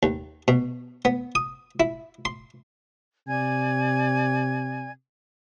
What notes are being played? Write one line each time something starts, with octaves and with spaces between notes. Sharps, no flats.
D#2
B2
B3
D#6
E4
C6
C3 D5 G#5 G#6